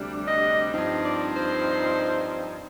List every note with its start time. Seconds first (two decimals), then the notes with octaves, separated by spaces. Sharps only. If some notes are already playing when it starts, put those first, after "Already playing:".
Already playing: D2 C3 G3 D4
0.28 D#5
0.73 G2 F3 C4 D#4
1.04 D5
1.35 C5